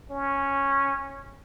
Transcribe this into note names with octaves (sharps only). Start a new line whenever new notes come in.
C#4